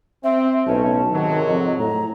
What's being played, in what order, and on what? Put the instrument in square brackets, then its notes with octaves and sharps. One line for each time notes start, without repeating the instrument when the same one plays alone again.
[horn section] C4 [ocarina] E5
[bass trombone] B1 [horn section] A2 C#4 [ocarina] A5
[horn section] G#2 C3 F#3 [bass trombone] D#3
[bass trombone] F2 [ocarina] D#5
[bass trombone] A2 [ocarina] A#5